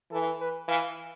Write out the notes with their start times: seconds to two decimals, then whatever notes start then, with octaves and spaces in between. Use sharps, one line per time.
0.11 E3 A4
0.40 B4
0.68 E3 F5